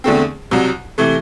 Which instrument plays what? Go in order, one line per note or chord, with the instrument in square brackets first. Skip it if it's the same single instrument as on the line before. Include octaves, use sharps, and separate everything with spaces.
[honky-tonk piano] E2 D3 A3 C4
C2 C3 F#3
C3 E3 A3